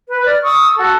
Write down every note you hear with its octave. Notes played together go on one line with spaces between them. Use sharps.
B4
D5 F6
C#6 D#6 E6
F#4 A4